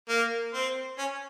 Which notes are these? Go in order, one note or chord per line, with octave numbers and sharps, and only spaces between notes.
A#3
C4
C#4